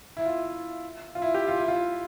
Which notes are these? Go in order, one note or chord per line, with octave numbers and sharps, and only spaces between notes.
E4
F4
F4
E4
G4
F4
E4
F4